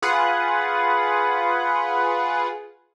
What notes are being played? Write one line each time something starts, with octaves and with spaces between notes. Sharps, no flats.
F4 G#4 B4 F#5